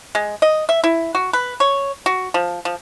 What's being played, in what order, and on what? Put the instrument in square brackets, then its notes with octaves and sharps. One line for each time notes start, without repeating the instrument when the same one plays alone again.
[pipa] G#3
D#5
E5
E4
F#4
B4
C#5
F#4
F3
F3